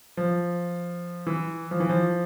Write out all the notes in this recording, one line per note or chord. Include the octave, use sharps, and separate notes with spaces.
F3
E3
F3
E3
F3